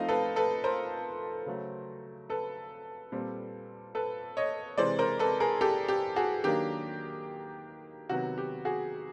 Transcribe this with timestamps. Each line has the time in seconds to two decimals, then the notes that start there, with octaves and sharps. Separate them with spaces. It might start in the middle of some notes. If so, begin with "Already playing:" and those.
Already playing: F3 A3 C4 D#4 D#5 F5
0.09 A4 B4
0.36 A4 B4
0.64 A#4 C5
1.46 C#3 F#3 A3
2.30 A4 B4
3.12 A#2 G3 C4
3.95 A4 B4
4.37 C#5 D#5
4.78 C3 E3 G#3 C5 D5
4.99 A#4 C5
5.19 A4 B4
5.40 G#4 A#4
5.61 G4 A4
5.88 G4
6.16 F#4 G#4
6.44 D#3 F#3 A#3 D4 G4
8.09 C3 D#3 F#3 B3 F#4
8.38 G4
8.65 F#4 G#4